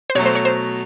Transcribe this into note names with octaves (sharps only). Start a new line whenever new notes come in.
C5
B2 F#3 A3 C#5
C5
C#5
C5